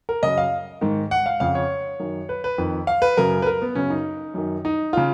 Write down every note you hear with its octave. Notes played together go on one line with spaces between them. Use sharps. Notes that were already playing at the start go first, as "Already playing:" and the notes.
A#4
F#2 C#3 D#5
F5
G#2 D#3
F#5
F5
F2 C#3 F5
C#5
F#2 D#3
B4
B4
F2 D#3
F5
B4
F#2 C#3 A#4
B4
A#4
B3
F#2 C#3 C#4
D#4
F#2 D#3
D#4
C#3 F4